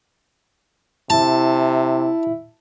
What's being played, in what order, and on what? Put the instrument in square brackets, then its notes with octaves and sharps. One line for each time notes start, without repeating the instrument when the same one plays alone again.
[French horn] C3 [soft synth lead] E4 [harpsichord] A5